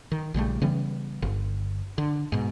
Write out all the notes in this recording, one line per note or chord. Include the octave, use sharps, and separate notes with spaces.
D#3
A#1 C#3 G3 A3
C#3 E3 G3 B3
G1
D3
G#2 B2